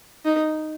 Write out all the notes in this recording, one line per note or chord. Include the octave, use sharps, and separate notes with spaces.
D#4